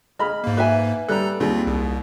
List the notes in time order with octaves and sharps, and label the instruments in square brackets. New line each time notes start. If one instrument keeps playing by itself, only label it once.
[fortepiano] G#3 B5 F6 [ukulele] D#5
[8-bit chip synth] G#2 A#3
[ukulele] B4 E5 G#5
[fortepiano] G3 F#6 [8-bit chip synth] A4 A#5
[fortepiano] D#2 G3 G#3 [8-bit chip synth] C4 F4
[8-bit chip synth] C2